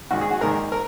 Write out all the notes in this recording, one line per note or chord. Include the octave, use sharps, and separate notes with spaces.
A#1 G#2 D#3 F#4
G#4
F#4
A#1 G#2 D#3 A#4
A#4